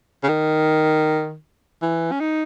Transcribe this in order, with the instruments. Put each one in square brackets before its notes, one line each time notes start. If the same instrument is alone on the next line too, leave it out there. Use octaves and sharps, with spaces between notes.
[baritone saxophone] C#3
D#3
E3
C#4
D#4